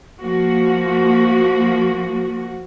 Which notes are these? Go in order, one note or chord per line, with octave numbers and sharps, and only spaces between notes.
F3 A#3 F#4